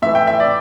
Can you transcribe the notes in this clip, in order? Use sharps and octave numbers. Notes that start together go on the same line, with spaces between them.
A2 E3 E5
G5
E5
D5